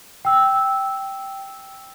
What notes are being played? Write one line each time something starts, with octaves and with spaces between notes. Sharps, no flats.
G5 E6